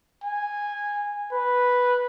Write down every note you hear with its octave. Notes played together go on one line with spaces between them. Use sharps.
G#5
B4